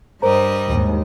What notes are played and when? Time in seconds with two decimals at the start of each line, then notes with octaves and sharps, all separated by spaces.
0.22 G2 G3 A#4 C5 D#5 A#5
0.68 D#2 G#2